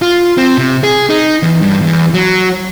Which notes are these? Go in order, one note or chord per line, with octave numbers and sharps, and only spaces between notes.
F4
C4
C3
G#4
D#4
E2
G2
E2
F#3